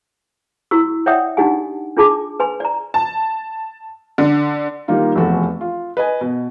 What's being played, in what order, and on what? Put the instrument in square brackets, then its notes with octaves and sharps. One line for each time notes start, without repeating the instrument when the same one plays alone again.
[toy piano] E4 F#4 C#6 E6
C#5 D5 E5 F#5 G5 D#6
D4 D#4 F#4 G4 F#5 G#5
D4 F4 G#4 A5 D6
B4 G#5 C6
D5 A#5
[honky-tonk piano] A5
D3
[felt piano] D#3 G3 A#3 D#4 F4
F1 E2 F#4 A4
F4
B4 D#5 G#5
B2